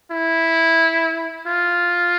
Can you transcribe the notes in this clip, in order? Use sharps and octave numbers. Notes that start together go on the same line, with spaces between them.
E4
F4